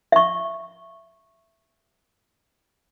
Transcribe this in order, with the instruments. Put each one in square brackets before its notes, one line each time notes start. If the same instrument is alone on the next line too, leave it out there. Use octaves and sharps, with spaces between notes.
[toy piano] E5 C#6